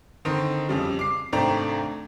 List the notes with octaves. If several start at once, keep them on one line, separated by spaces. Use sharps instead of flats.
D3 D#3 C4 D#4
F2 C#3 G3
D6 C7
G#1 C3 A3 D4 G5 A#5